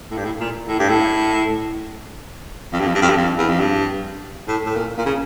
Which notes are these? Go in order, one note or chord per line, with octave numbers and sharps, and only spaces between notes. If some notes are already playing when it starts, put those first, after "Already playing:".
A2
G2
A2
A#2
A2
G2
A2
F2
G2
F2
G2
F2
G2
F2
E2
F2
G2
A2
A2
A#2
A#2
C#3